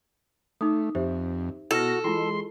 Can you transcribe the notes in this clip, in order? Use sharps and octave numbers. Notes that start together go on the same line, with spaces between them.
A3 D#4 D6 D#6
F2 G4 C5 E5
B2 E4 F#4 A4 F6 A#6
E3 G#3 E4 F4 G#4 C6